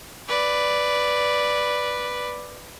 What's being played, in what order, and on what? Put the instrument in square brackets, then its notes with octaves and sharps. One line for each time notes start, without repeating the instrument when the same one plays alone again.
[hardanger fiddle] B4 D5